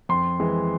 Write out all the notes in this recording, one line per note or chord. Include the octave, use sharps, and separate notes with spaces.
F2 C6
E3 G#3